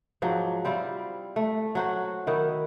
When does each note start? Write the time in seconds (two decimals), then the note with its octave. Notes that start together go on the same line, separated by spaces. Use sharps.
0.22 G#2 F3 F#3 C4
0.65 G3 C4 E4 F4
1.36 A3
1.75 F#3 F#4 C5
2.27 D#3 E4 F#4